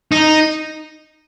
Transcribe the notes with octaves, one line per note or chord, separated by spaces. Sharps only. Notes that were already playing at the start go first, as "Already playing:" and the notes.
D#4